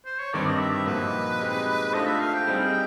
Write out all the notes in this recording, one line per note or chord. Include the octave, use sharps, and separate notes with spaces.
C5
C#5
G2 D#3 G3 C4 D5
D#5
E5
A#2 F3 A#3 D#4 F#4 B4
G#3 C4 D#4 G4
A3 D4 F4 A4 C5 D#5
E5
F5
G5
G3 C4 D#4 G#4